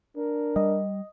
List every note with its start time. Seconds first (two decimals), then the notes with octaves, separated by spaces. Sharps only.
0.17 D4 A#4
0.56 G3 D#5